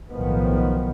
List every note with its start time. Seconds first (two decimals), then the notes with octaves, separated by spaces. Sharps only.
0.11 B1 A2 D#3 F3 B3